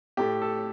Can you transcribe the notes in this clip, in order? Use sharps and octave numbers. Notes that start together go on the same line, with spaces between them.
A2 A3 G4
A4